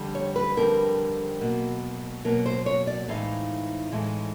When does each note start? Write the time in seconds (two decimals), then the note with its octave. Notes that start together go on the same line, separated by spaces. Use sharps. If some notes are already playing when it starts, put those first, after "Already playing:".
Already playing: F2 D3 G3 C4
0.15 C#5
0.36 B4
0.57 F2 D3 G3 C4 A#4
1.41 B2 F#3 A#3
2.24 B2 F#3 A#3 A#4
2.46 C5
2.66 C#5
2.87 D5
3.08 A2 E3 G#3 C4 D#4 F5
3.92 A2 E3 G#3 C4 D#4